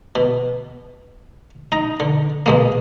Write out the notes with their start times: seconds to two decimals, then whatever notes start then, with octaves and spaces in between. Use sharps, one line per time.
0.15 B2
1.72 D#4 A#5
2.00 D3
2.46 B2 G#3 A#3